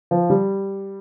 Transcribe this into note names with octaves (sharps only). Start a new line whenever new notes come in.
F3
G3